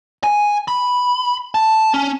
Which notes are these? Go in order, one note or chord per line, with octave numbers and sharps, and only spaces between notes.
G#5
B5
A5
C#4